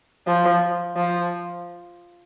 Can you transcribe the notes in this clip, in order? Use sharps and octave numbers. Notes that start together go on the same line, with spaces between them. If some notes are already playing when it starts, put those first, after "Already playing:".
F3
F3